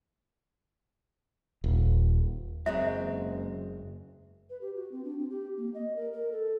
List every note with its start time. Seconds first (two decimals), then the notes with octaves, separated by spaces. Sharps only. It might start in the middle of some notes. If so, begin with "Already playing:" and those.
1.64 D#1
2.66 F#1 F#3 G#3 C4 E5
4.50 B4
4.61 G4
4.75 F#4
4.92 C4
5.04 D4
5.18 C4
5.30 G4
5.57 A#3
5.74 D#5
5.96 A#4
6.13 A#4
6.32 A4